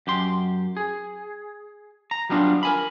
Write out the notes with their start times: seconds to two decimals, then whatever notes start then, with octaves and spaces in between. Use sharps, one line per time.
0.07 F#2 G4 C6
0.77 G#4
2.11 A#5
2.30 F#3 G3 B3 D4 F4
2.63 A#4 G#5 B5